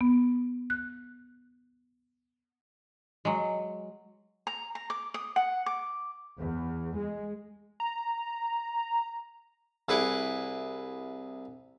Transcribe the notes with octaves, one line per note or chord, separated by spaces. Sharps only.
B3
F#6
F#3 G#3
A#5
A#5
D6
D#6
F#5
D6
E2
G#3
A#5
C2 E4 G#4 B4 C#6 D6